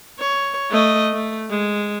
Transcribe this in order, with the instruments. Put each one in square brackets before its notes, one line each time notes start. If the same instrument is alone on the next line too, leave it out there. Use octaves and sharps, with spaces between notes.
[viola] C#5
A3 D#5
A3
G#3